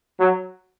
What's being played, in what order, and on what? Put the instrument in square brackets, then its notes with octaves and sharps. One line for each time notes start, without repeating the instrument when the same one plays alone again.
[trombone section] F#3